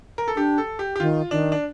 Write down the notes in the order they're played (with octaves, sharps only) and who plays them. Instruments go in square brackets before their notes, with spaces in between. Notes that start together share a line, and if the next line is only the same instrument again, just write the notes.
[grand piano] A#4
A4
[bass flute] D4 [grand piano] G4
[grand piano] A4
G4
G4
[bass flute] D#3 [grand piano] F4
[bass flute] D#3 [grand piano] D4
[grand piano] D4